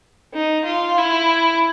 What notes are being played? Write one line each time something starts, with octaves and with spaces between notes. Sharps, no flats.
D#4
F4
E4